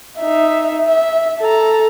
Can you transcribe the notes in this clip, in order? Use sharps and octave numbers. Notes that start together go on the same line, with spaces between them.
D#4 E5
E5
A4 A#5